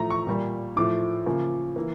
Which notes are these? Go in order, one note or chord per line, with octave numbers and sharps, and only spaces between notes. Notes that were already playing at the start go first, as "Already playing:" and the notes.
Already playing: A2 F3 A3 A#5
C#6
A#2 G3 A#3
A2 F3 A3 D6
C#3 F3 A#3
E3 A#3